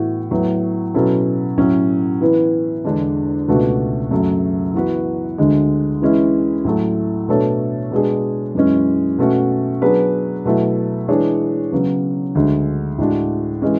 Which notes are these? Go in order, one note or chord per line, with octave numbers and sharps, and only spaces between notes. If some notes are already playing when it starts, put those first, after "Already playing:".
Already playing: A2 E3 B3 F#4
A2 F#3 B3
B2 F#3 C#4 E4 A4
A2 F#3 C#4
E3 B3 E4 B4
E2 D3 G#3 D4
C#2 B2 A3 D4 F#4
F#2 C#3 F#3 A3
E3 B3 F#4 B4
D2 D3 G#3
E3 G#3 C#4 E4
A2 F#3 A3
B2 A3 D4 A4 C#5
B2 G#3 D4 G#4
F#2 E3 G#3 C#4
B2 A3 C#4 F#4
F#3 B3 D4 G#4 B4
B2 F#3 A3 E4
E3 G#3 D4 G#4 C#5
C#3 F#3 B3
D2 D3 G#3
A2 G#3 D4 F#4
E3 G#3 C#4